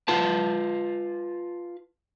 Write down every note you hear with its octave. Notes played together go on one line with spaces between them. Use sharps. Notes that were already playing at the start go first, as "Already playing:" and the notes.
F4 B4 A5